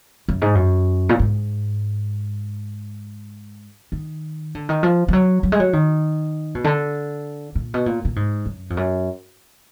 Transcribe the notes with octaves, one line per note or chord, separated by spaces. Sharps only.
F#2
G#2
F#2
A#2
G#2
D#3
D3
D#3
F3
F3
F#3
F#3
G#3
F#3
D#3
B2
D3
A#2
B2
A#2
A#2
G#2
F#2
F2
F#2